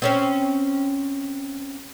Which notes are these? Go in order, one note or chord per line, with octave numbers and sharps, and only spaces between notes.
C4 C#4 C#5